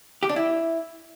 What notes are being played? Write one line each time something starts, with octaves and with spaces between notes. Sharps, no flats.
G4
D4
E4